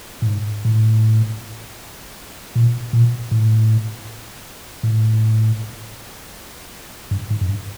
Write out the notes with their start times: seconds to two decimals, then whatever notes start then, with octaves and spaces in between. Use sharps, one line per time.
0.22 A2
0.27 G#2
0.65 A2
2.56 A#2
2.93 A#2
3.31 A2
4.83 A2
7.11 G2
7.30 G#2
7.41 F#2
7.49 G2